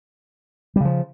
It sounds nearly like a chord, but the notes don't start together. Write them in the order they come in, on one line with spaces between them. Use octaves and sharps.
G3 C#3 F3